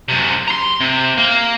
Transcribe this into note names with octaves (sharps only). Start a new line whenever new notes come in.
F#2 C3
A#5 C6
C3
A#3